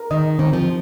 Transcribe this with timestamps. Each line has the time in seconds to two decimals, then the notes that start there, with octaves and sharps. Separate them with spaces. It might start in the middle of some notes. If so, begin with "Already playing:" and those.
Already playing: A#4
0.11 D#3 D#5
0.39 D#3 C4
0.53 F3